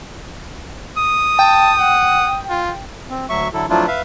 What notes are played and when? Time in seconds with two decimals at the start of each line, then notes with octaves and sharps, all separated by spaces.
0.97 D#6
1.39 G5 A5
1.79 F#5
2.50 F4
3.10 C4
3.29 D2 F#3 E5 C#6
3.54 D3 F#3 E4 A4
3.70 F3 F#3 A3 D4 E4 F4
3.87 B4 E5 F5